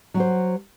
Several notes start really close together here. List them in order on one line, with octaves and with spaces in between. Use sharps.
F#3 F#4 C5